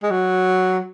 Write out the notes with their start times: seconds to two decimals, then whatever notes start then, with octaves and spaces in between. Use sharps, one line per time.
0.03 G#3
0.11 F#3